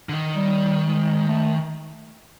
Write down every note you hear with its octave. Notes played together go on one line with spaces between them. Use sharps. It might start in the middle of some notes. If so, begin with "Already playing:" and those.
D3
D#3
G3
G#3
A3